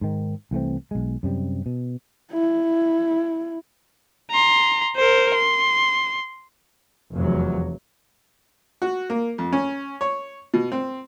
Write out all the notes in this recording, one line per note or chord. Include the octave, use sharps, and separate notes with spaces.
G#2 D#3
C2 E3 A3 C4
B1 G#3
F#2 C3 G3
B2
E4
A#5 C6
A#4 C5
C6
F1 E2 F#3
F#4
A#3
F2
C#4
C#5
B2
C4